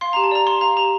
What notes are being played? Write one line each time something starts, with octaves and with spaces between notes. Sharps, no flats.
F5 C6
G4 A#5
A5
D5 A#5
G4 C6
F5 A#5
G4 A#5